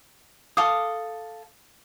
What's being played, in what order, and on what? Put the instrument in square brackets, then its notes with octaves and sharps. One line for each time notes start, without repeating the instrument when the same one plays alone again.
[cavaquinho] A4 F5 D6 D#6